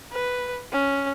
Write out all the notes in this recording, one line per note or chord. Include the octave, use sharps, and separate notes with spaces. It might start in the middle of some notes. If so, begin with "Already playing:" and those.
B4
C#4